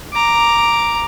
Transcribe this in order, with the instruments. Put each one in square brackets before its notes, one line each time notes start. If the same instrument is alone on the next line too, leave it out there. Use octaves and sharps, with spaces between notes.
[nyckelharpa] A#5 D6